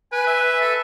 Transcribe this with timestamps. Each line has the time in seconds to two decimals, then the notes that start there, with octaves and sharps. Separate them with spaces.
0.12 B4 G#5
0.27 E5
0.60 A4